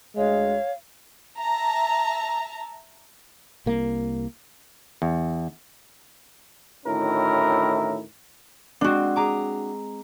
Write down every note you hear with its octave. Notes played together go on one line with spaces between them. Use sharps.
D2 G#3 C#5 F5
E5 A5 A#5
C2 A#3
E2
D2 A2 D#3 C#4 E4 A#4
G#3 C4 D4 F#4
G#4 A#5 D6